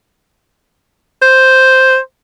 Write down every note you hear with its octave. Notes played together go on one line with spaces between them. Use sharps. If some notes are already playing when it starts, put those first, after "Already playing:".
C5